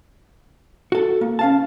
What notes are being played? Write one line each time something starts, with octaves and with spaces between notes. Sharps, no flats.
F#4 A4
A#3
C#4 F5 A5